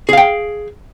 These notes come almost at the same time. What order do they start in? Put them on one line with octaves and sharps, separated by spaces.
G#4 F5 G5